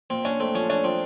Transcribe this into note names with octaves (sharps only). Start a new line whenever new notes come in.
A#2 C4
C#4 D4
A3 C4
F3 C#4
C#4 D4
F3 C4